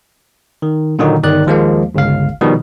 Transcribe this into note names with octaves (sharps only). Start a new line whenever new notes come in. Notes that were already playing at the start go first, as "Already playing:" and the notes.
D#3
A#2 D3 D#3 F#3 D#4
G1 D#3 D5 F#6
D#2 F3 G#3 A#3
G1 C#2 F5
B2 D#3 F3 G3